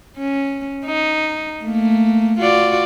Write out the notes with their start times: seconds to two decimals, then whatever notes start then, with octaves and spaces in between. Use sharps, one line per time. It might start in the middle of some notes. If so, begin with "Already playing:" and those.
0.17 C#4
0.85 D#4
1.65 A3 A#3
2.39 F4 F#4 D5